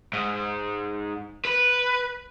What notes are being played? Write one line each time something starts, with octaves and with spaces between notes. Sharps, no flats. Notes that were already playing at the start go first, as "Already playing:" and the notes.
G#2
B4